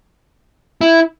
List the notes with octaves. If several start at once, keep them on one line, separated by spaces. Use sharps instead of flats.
E4